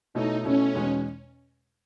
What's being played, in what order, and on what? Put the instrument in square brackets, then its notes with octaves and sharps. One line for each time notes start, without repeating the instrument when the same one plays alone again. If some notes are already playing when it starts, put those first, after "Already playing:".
[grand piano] B2 A3 E4 A4 C#5 [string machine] D#4
[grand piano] B2 A3 E4 A4 C#5 [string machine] C#4
[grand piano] E2 B2 G#3 D#4